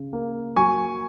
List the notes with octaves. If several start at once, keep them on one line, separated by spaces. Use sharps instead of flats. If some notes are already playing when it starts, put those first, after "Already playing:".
Already playing: C#3
A#3
F#3 G#5 C#6